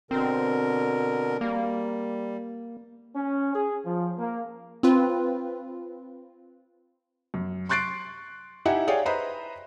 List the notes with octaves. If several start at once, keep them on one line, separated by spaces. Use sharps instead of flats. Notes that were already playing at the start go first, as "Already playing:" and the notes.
B2 D3 C4 A#4
G3 A#3
C#4
G#4
F3
A#3
C4 F4 B4
F#2
C6 C#6 F#6 A6 C7 D7
D#4 E4 G4 E5 F#5 G#5
G#4 C#5 D5 F5 G5 G#5
B4 C5 D#5 E5 A#5 B5